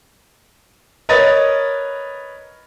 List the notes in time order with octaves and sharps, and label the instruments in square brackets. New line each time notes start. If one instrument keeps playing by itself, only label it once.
[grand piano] A#4 B4 C#5 D#5 D#6 A6